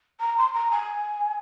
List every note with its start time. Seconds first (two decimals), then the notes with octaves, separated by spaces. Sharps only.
0.20 A#5
0.38 C6
0.54 A#5
0.71 G#5